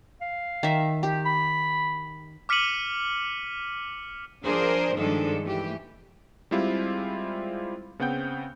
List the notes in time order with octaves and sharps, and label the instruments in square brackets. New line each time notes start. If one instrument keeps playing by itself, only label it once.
[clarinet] F5
[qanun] D#3 E5
G4
[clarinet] B5
[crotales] D6 F6 B6 C#7 D#7 F#7
[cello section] F3 D4 G#4 A#4 C5 D5
G2 D#3 F3 G#3 D4 A4
E3 A3 G4
[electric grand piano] G3 G#3 C4 E4 F4 G4
C#3 B3 C4 F#5 G5 G6